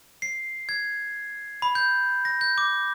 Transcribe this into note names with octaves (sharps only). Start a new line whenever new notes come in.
C7
G#6
B5
G6
A#6
G6
D6